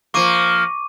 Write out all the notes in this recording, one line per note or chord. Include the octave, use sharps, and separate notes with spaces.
F3 A#3 C#6 D6 D#7